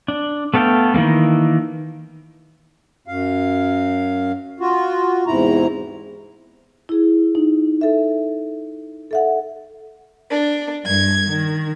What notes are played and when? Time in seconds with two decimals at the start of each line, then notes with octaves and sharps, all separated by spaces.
0.08 D4
0.54 A3 B3 A4 F5 G5
0.94 D#3 E3 A3 A#3
3.08 F#2 F5
4.60 F4 F#4
5.27 E2 G#2 C3 E4 A#5
6.89 E4 G#4
7.35 D#4
7.81 A4 E5
9.11 A4 E5 F#5
10.31 D4
10.84 G2 G#6
11.27 D#3